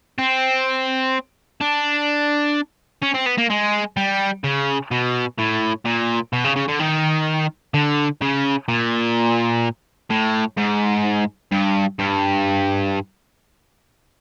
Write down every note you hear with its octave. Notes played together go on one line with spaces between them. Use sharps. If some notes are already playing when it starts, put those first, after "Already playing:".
C4
D4
C#4
C4
B3
A#3
G#3
G3
C#3
B2
A2
A#2
B2
C#3
C#3
D3
D#3
D3
C#3
A#2
A2
G#2
G2
G2